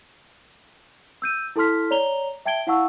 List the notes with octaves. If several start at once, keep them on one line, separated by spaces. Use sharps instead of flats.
E6 G6 D#7
E4 A4 A5 C6 F6 B6
C#5 D5 A#5 F7 G7
E5 G5 A5 G#6 D7 G7
E4 F5 F#5 A5 C#6 E6